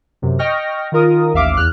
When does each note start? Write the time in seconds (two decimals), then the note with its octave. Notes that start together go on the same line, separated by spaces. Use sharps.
0.22 F#2 C3
0.39 D#5 G5 C#6 F6 A#6
0.92 D#3 F4 A#4 D#6
1.34 A1 D#2 E5 F5 D6
1.57 E2 F6 F#6